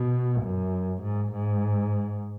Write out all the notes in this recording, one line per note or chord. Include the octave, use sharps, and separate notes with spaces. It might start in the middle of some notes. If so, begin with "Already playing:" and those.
Already playing: B2
F#2
G#2
G#2